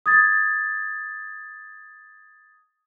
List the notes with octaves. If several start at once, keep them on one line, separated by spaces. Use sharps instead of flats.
D#6 G#6 A6